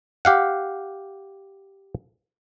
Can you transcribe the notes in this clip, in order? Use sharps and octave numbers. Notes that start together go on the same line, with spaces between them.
G4 F5 F#5